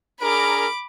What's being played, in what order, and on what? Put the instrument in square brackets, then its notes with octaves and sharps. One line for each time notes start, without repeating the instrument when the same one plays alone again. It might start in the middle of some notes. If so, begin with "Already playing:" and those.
[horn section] D4 G#4 A#4 [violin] B5 D6